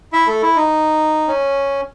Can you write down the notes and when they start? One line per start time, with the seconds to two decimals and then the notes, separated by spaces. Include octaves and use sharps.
0.13 E4 E5
0.27 A3 A4
0.42 E4
0.56 D#4
1.28 C#4